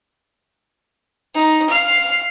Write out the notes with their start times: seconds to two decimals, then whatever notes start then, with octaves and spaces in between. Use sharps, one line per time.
1.35 D#4
1.70 F5